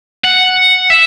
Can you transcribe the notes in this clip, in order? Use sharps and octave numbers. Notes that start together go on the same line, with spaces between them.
F#5
E5